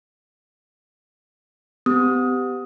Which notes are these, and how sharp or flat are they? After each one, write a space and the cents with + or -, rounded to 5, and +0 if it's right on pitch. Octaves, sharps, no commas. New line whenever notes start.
B3 +40 G4 +0 D#6 +10